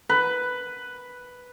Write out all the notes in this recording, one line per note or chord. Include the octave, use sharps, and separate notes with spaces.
B4